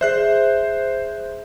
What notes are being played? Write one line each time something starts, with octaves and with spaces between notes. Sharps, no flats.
G#4 C5 D5 E5 F#6 C7